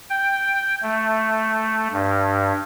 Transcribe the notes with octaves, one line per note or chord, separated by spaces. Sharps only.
G5
A3
G2